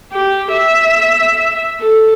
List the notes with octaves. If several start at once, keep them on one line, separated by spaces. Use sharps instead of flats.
G4
E5
A4